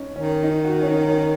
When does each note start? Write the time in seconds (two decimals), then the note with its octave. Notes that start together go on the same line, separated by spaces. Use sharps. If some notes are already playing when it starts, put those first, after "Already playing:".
Already playing: C#4 D#4
0.16 D#3 C#4
0.43 D#4
0.65 F#4
0.81 C#4
0.86 D#4
1.07 C#4